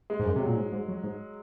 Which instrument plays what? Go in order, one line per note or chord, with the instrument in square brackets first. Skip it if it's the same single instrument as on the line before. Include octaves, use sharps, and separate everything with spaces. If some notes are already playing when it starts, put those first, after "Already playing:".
[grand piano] G#3
[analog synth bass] G#2
F#2
[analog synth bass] C3 [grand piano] F#3
[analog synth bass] A#2
G#2
G#2
F#2
G#2